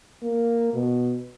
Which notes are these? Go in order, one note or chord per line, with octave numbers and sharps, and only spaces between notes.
A#3
B2